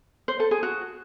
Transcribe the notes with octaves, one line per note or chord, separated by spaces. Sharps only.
C5
A4
G#4
F#4